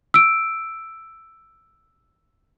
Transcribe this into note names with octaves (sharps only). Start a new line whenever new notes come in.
E6 D7